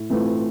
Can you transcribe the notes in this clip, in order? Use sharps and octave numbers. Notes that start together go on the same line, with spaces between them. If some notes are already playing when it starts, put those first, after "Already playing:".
Already playing: A2
E3 A3 C4 F4